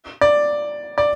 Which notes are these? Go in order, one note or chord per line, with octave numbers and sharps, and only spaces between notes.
D5
D5